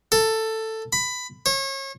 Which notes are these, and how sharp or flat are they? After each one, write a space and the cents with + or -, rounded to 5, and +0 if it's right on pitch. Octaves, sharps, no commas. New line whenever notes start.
A4 +10
B5 +15
C#5 -35